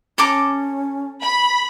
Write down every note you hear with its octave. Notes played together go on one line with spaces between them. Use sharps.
C#4 A4 A#5 D6
B5